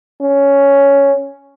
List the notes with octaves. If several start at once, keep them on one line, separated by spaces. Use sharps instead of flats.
C#4